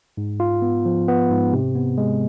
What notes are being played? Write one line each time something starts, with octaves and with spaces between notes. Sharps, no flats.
G#2
F4
B3
F3
B3
G#2
C3
B3
G#3